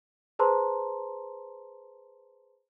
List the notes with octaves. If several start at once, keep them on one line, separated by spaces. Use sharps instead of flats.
G#4 B4 C5 A5 A#5 C6